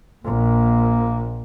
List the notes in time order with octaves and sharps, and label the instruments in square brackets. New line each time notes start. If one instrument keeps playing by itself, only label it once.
[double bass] A#1 [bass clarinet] A#3